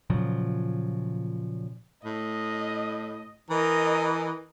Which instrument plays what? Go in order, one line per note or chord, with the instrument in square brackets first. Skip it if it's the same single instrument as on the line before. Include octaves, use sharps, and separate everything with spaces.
[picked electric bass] A#2 C#3 F3 F#3
[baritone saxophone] A2 [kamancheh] D#5
[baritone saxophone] E3 [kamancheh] A#4 D#5